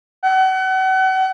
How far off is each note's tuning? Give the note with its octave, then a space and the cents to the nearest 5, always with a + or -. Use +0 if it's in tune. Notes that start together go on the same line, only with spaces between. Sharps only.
F#5 +35